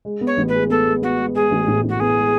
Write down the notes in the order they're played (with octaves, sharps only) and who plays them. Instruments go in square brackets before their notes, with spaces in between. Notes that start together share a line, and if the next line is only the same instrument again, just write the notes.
[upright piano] G#3
B3
[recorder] C#5
[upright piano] A1
[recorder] B4
[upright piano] G#3
[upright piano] B3 [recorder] A4
[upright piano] G#3
[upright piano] B3 [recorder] F#4
[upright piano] G#3
[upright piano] G#3 [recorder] G#4
[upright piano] A1
A2
A2
[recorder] F#4
[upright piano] B3 [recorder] G#4
[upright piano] G#3